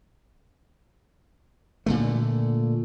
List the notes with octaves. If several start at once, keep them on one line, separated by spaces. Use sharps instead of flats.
A#2 D3 A3